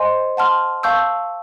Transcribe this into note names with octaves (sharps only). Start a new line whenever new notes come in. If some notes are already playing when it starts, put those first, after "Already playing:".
Already playing: C5 D#5 G#5 C6
F#5 A5 C6 F6
F5 A5 C#6 E6 G6